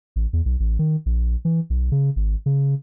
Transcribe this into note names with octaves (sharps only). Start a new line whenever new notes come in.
A1
E2
B1
A1
D#3
A#1
E3
B1
C#3
G#1
C#3